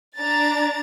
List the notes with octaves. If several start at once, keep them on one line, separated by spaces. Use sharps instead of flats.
D4 A#5 A6